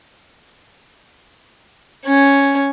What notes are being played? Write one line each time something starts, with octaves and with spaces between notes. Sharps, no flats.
C#4